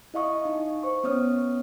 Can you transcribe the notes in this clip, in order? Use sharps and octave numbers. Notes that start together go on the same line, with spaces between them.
E4 D#5 F5 C#6 D#6
D#4
C5 C#6
B3 C#4 C#5 D#6 F6